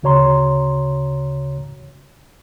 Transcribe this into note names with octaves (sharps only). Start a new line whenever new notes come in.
D2 C#3 F#4 C#5 A#5 C6